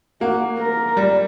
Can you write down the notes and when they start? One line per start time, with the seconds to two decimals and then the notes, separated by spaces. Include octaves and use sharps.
0.21 A#3 F#4
0.59 A#4
0.97 G3